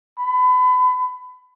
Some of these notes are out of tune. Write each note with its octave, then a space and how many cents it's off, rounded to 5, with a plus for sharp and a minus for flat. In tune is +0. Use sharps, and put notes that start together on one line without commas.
B5 +30